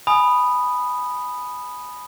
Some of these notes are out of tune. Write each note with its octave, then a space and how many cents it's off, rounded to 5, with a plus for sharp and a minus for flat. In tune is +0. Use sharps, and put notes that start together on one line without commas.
G#5 +15 B5 +0 D#6 -10